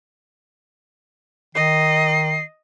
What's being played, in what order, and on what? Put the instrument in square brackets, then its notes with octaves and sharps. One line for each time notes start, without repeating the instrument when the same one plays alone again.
[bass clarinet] D#3 [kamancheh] D#5 [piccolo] C7